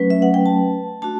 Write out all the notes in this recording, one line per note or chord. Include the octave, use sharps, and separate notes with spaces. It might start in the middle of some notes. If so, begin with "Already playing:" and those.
Already playing: F#3 A3 C#4 B4
E5
F#5
G5
A5
A3 D4 F#4 A5